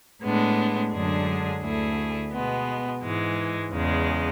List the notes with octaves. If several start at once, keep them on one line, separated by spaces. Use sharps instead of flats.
A2 G#3 B3 D4
F#2 D3 G#3 D4 G#4
D2 D3 A3 E4 G#4
B2 G#3 B3
G#2 E3 G#3
E2 C#3 G#3